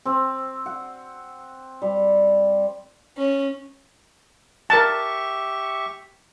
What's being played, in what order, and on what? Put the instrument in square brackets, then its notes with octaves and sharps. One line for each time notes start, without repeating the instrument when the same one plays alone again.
[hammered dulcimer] C4
F#5
G3
[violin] C#4
[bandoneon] G4 E5 C#6 [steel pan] A#4 A5